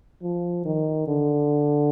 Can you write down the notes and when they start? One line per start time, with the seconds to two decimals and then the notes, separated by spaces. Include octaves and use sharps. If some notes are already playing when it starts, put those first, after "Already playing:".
0.22 F3
0.65 D#3
1.07 D3